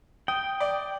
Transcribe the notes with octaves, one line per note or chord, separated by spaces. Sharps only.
G5 D#6
D5